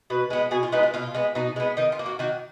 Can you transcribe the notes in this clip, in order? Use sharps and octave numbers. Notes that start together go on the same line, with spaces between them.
B2 B4
G#3 B3
B2 G#4
F4
G#3 B3 D#4
F4
B2 F4
G#3 B3
B2 D#4
G#3 B3
D#3 D#4
F4
A#3
F#4
D#3 F#4